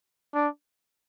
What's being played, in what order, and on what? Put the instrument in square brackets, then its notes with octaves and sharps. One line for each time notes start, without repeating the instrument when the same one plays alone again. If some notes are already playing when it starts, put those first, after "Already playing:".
[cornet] D4